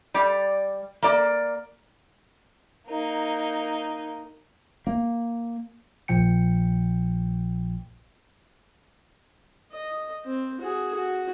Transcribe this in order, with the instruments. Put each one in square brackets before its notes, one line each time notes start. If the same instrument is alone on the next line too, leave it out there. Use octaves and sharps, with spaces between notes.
[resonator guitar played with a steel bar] G3 D5
A#3 D5
[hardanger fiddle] A#3 D#4
[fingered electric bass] A#3
[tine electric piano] A#1 A#2 F3 G5 C#7
[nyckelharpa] D#5
C4
F#4 G#4
F#4